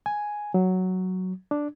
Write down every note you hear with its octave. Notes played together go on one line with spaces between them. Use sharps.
G#5
F#3
D4